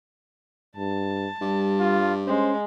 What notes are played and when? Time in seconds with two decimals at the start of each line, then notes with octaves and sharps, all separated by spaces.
0.77 G2 A5
1.41 G2 G3
1.80 F4
2.27 G#3 C#4 C5